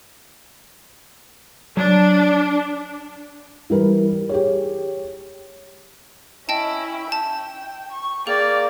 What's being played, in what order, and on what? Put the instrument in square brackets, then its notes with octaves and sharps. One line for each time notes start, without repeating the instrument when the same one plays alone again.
[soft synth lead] F#3 [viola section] D4
[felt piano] E3 G3 A#4 B4
G4 G#4 C#5
[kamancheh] C#4 E4 [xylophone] D#5 G5 A5
[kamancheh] G5 [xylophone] A5
[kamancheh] C#6
[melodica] A#3 [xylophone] G#4 [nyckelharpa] D5 [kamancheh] G5